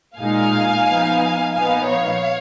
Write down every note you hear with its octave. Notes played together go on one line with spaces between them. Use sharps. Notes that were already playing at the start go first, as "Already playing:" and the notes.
A#2 G#3 D#4 F5 G#5
F3 B3 D#4
A#2 F3 B3 D#4 F5 G#5
C#5 F5